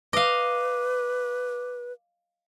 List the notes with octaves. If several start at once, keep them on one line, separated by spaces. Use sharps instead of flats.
B4 D#5 F5 D6